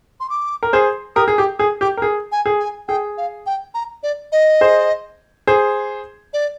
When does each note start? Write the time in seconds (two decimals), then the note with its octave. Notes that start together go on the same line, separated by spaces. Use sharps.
0.20 C6
0.30 D6
0.63 A#4
0.73 G#4 C5
1.16 G4 A#4 D#6
1.28 G#4
1.38 G4 D6
1.59 G#4 D#6
1.81 G4 D6
1.97 A#4
2.02 G#4
2.32 G#5
2.46 G#4
2.60 G#5
2.88 G#4 G5
3.18 F5
3.46 G5
3.74 A#5
4.03 D5
4.32 D#5
4.61 G#4 C5
5.47 G#4 C5
6.33 D5